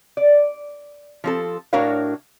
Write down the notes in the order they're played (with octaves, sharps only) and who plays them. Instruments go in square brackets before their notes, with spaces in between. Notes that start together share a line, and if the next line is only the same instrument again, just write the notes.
[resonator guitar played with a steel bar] D5
F3 C4 A4
A2 D4 F#4 A#4 C#5 F5